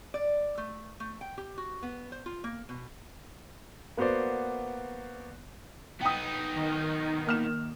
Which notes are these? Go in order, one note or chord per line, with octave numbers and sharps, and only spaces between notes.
D5
A3
A3
G5
G4
F#4
B3
C5
F4
A#3
B2
A#3 B3 F#4 C5 D5
B3 D#4 G5 D#6
D#3
A#3 F6 E7